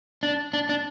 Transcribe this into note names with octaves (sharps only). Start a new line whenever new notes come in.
D4
D4
D4